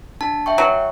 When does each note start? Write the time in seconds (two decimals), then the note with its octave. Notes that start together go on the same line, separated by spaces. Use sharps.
0.21 D4 A5
0.46 E5 G5 C#6
0.58 F#3